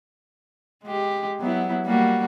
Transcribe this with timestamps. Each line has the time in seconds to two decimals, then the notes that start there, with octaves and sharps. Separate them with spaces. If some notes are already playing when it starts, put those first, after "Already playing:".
0.84 G#3 G4
1.40 F#3 B3 E4
1.85 G3 A#3 F#4